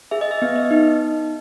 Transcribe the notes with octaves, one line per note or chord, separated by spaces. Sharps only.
G#4 E5
D#5
E5
B3
D#5
D#4